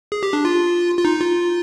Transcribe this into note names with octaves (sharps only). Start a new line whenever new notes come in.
G#4
G4
D4
F4
F4
D#4
F4